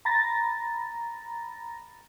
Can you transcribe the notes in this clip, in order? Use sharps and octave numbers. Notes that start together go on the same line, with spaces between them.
A#5 B5 A6 A#6